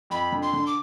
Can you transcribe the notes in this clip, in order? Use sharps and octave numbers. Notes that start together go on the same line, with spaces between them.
F2 B5
D3
C6
D3
D6